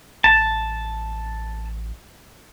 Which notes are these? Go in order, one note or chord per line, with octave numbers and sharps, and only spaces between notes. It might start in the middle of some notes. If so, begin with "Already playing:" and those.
A1 A5